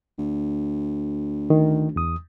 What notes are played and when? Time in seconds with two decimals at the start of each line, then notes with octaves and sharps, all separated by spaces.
0.18 D2
1.50 D#3
1.96 E2 D#6